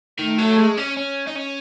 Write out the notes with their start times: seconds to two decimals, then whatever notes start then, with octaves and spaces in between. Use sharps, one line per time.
0.19 D#3 A3
0.38 F#3
0.58 G#3
0.78 C#4
0.97 C#4
1.27 D#4
1.36 C#4